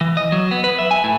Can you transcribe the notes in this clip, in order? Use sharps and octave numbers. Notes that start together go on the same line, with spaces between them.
E3
D#5
F#3
B3
B4
E5
G#5
A2